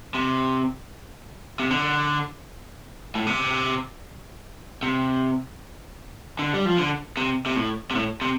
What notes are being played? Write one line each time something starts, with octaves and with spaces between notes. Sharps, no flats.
C3
C3
D3
A2
C3
C3
D3
G3
F3
D3
C3
C3
A2
C3
A2
C3